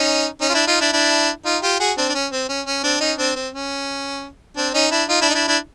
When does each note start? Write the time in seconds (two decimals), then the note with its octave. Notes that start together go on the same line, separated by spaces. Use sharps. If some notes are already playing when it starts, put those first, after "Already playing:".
Already playing: C#4 D#4
0.41 C#4 D#4
0.49 F4
0.54 D4 E4
0.67 D#4 F4
0.80 D4 E4
0.93 D4 E4
1.45 D#4 F4
1.63 F4 G4
1.80 F#4 G#4
1.98 C4 D4
2.09 D4
2.14 C#4
2.32 C4
2.49 C#4
2.66 C#4
2.84 C4 D4
3.00 C#4 D#4
3.18 C4 D4
3.36 C4
3.53 C#4
4.57 C4 D4
4.74 C#4 D#4
4.91 D4 E4
5.09 D#4 F4
5.21 D4 E4
5.30 D#4
5.35 D4 E4
5.47 D4 E4